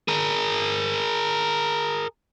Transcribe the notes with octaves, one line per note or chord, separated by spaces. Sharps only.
G#4 A#4